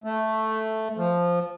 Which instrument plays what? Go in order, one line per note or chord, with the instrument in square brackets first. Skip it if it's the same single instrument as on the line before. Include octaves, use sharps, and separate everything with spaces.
[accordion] A3
F3